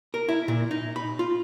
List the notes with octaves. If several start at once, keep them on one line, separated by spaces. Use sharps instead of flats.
A#4
E4
A#2
D#4
B5
F4